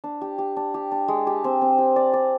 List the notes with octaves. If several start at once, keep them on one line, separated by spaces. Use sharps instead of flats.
D4
G4
G4
D4
G4
D4
G#3
G4
C4
C4
G4
D5
D5